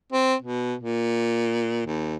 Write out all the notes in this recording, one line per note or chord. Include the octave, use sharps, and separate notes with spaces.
C4
B2
A#2
D#2